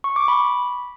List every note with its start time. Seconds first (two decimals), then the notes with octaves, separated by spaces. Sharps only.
0.04 C#6
0.16 D6
0.28 B5